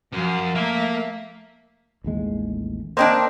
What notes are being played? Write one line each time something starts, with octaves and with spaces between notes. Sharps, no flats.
F#2 F3 F5
A3 A#3 E5 F5
A1 D#2 G#3
A#3 C4 D4 C5 D#5 G5